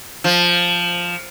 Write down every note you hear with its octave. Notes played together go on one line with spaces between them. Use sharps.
F3